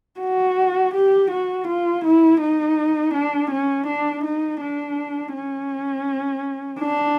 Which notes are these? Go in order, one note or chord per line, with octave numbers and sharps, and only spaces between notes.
F#4
G4
F#4
F4
E4
D#4
D4
C#4
D4
D#4
D4
C#4
D4